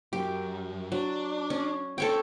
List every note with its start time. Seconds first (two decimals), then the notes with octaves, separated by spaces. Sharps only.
0.13 F#2 G4
0.92 F#3 D4
1.50 C#4
1.98 C4 C#4 A4 C#5 G5